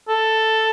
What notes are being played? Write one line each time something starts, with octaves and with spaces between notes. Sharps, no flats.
A4